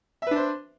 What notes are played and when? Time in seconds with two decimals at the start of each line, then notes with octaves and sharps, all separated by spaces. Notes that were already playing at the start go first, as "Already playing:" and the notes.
0.22 E5
0.27 B4
0.31 D4
0.36 C5